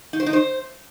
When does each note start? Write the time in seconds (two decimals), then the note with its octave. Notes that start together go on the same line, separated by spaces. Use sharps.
0.13 D#4
0.20 C5
0.26 D#4
0.33 C5